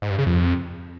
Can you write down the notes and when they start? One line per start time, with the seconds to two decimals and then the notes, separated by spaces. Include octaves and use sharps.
0.02 G#2
0.10 G2
0.18 C#3
0.27 F2